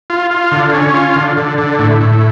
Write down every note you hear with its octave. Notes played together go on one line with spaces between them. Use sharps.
F4
F4
D3
C#4
F4
D3
D3
D3
A2
A2